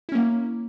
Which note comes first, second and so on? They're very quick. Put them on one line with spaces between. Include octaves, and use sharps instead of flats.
E4 C#4 A#3